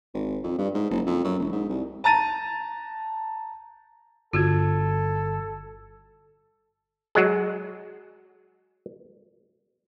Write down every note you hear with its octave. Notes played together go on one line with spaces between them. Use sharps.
G#1
F2
G2
G#2
F#1
F2
F#2
E1
G#2
C2
A5 A#5 A6 D#7
G1 F4 F#4 A4 G#6
F#3 G#3 G#4